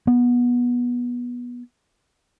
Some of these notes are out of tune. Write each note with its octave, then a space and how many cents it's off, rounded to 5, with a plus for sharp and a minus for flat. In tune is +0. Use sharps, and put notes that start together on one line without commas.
B3 -20